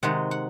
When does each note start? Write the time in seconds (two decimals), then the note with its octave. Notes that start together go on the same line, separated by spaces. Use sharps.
0.03 C3 D#3 G#3 F#5
0.31 F#5